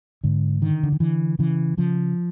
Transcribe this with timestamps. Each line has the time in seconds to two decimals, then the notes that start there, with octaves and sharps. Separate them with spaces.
0.24 G#2 D3
0.62 D3 D#3
0.83 D3
0.92 D#3
1.00 D3 E3
1.39 C#3 E3
1.77 C#3 F3